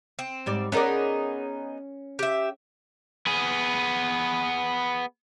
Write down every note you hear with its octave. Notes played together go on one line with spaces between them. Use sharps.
C4
G#2 G3 D5
B3 C#4 D#4 G#4 A#4 D5
G4 E5
B3 G#4